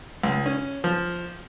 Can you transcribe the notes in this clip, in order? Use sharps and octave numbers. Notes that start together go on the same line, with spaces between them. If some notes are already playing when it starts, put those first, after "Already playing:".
C#2
C#4
F3